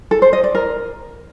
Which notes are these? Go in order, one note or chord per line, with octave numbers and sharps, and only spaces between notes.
A4
C5
D#5
D5
A#4